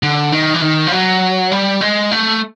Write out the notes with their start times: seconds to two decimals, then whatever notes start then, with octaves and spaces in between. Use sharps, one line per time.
0.03 D3
0.32 D#3
0.54 E3
0.61 D#3
0.87 F3
0.92 F#3
1.52 G3
1.81 G#3
2.11 A3